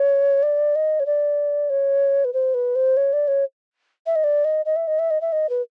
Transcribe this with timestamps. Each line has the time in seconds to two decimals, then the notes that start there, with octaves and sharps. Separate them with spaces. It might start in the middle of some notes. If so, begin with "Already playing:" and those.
Already playing: C#5
0.43 D5
0.75 D#5
1.00 C#5
1.06 D5
1.70 C#5
2.25 B4
2.33 C5
2.54 B4
2.75 C5
2.97 C#5
3.13 D5
3.28 C#5
4.06 E5
4.16 D#5
4.24 D5
4.45 D#5
4.65 D#5
4.76 E5
4.87 D#5
4.99 E5
5.11 D#5
5.21 E5
5.32 D#5
5.49 B4